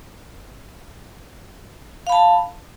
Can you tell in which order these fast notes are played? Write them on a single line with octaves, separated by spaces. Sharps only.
F5 B5 A5